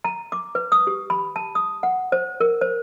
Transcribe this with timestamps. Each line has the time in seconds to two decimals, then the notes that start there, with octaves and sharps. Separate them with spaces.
0.04 A#5
0.32 D6
0.55 B4
0.72 D#6
0.87 G4
1.10 B5
1.36 A5
1.55 D#6
1.83 F#5
2.12 C5
2.40 A#4
2.61 C5